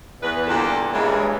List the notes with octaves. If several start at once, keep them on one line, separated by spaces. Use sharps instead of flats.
E2 B4
E2 A#2 D3 G3 F4 A4
G2 A#2 C#3 E3 G#3